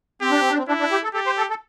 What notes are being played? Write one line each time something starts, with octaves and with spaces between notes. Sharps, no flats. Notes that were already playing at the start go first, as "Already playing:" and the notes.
C4 G4
D4
C4
D4
C4
D4 E4
D4
G4
A4
G4 A4
C5
A4
A4